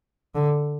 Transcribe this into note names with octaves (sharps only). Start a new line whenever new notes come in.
D3